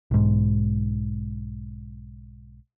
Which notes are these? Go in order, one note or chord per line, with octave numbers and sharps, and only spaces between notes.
B1 G#2